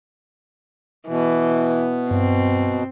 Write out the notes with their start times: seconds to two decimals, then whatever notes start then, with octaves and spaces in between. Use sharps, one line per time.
1.08 B2 E3
2.11 G2 C4